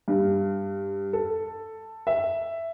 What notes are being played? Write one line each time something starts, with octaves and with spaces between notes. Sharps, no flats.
G2
A4
E5